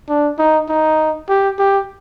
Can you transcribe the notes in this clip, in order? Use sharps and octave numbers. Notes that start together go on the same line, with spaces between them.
D4
D#4
D#4
G4
G4